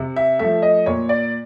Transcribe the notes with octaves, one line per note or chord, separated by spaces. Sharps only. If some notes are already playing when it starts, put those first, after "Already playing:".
Already playing: C3
E5
F3 A3 E5
D#5
A#2 C#5
D5